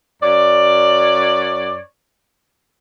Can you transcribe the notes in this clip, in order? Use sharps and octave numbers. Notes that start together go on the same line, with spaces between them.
F#2 C#5 D5